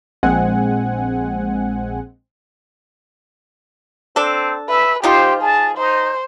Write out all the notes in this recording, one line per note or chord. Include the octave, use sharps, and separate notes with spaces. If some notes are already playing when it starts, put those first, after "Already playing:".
A#1 G#3 C4 F#5 G#5
C4 D4 A4
B4 E5
F3 D#4 F4 G4 C5
G#4 A5
D#4 C5